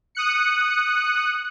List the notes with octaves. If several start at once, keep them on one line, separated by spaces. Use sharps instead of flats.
D#6 F#6 C#7